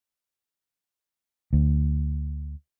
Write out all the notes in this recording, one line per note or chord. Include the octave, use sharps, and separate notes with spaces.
D2